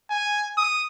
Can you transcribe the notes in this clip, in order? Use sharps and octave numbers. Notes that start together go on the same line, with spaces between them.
G#5
D#6